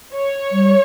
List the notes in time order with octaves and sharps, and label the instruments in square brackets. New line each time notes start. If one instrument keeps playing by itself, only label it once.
[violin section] C#5
[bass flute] G3